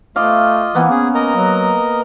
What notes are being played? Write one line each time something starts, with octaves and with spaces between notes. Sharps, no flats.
A3 F4 D#5 F5 D6
E3 A#3 B3
C#4 G#4
A#4 D#5 A#5
F#3